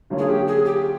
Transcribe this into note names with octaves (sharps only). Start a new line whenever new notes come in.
D3 F#3 A#3 C#4 F4
G#4
G4
G#4
G4